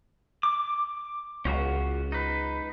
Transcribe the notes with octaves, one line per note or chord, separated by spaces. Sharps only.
D6
C#2 C#4 F4 F#4
D#4 B4